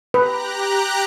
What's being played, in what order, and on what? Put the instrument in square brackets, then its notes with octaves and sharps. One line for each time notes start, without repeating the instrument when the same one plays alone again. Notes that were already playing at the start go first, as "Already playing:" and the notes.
[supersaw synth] G4 A#5 F#6 [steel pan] B4